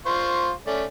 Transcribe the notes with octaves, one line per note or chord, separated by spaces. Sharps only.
F4 C5 C#6
A3 C#4 D5